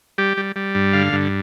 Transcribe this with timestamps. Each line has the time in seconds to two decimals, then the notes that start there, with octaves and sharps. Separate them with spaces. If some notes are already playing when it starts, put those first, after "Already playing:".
0.18 G3 G4
0.37 G3
0.56 G3
0.75 G2
0.93 D3 F5
1.13 G2